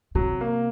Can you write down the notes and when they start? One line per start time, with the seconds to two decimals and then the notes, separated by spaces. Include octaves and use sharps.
0.15 C3 F#3
0.41 A#3